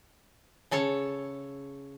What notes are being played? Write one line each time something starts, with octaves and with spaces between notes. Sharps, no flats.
C#3 A4 C#5 A5